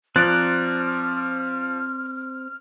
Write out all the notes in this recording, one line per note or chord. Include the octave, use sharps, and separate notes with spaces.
F3 C4 D5 A#5 F6 F#6 A6